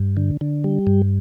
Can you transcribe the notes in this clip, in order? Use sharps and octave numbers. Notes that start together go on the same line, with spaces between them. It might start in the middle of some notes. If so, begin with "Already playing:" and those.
Already playing: G2
D3
D3
G3
G2